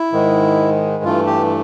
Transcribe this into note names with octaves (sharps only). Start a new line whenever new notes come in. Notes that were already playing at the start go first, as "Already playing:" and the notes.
Already playing: E4
G#2 D#3 G#3
G2 E3 A3 F4
G4